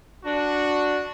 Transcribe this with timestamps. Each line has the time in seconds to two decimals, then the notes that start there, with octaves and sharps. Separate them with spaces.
0.24 D4 F#4